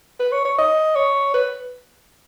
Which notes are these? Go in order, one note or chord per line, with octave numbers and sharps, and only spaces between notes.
B4
C#5
C#5
D#5
C#5
B4